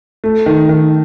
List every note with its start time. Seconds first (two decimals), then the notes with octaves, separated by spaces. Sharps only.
0.24 A3
0.46 D#3
0.69 D#3